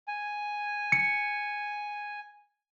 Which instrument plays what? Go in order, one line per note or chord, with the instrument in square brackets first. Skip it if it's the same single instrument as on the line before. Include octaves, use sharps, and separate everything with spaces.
[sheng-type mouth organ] G#5
[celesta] C#7